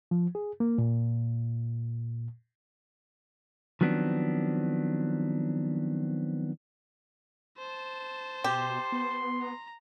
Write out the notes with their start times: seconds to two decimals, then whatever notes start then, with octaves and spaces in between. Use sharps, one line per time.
0.11 F3
0.35 G#4
0.60 A#3
0.78 A#2
3.81 D#3 F3 F#3 B3 C4 D4
7.58 C5 A5
8.44 B2 G4 C6
8.92 B3
9.42 A#5